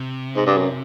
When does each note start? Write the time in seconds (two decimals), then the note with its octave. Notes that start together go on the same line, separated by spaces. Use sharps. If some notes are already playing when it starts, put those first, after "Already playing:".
Already playing: C3
0.36 G#2
0.46 G2
0.57 F#2